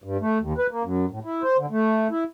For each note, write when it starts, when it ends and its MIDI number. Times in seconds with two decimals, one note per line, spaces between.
0.04 0.17 43
0.20 0.38 57
0.40 0.53 39
0.58 0.67 71
0.71 0.83 58
0.83 1.05 42
1.11 1.19 45
1.25 1.42 64
1.43 1.57 72
1.58 1.66 50
1.71 2.08 57
2.11 2.24 64